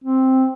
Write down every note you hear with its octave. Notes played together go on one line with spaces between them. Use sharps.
C4